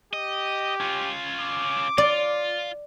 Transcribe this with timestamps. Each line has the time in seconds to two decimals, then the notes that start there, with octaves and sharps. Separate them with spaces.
0.13 G4 D#5
0.80 C#4 F4
1.40 D6
1.98 F4 D5